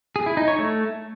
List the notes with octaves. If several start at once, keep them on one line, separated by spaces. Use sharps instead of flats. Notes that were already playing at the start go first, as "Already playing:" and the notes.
G#4
E4
D#4
C#5
A3